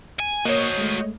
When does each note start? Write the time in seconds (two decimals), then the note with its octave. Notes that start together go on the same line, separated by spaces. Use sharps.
0.20 G#5
0.45 A#3 F#4 C5 C#5 D#5
0.78 G#3 A3